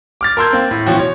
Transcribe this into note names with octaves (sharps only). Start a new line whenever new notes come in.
D6 F6 A6
A#4 A5 C6 E6 G6 G#6
A#3 C4
A2
B2 E3 F3 C#4 F#4 G5
C#5